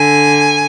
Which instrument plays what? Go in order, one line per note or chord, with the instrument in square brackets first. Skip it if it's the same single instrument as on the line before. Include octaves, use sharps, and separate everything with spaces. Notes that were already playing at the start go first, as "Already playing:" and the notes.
Already playing: [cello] D3 [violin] G#5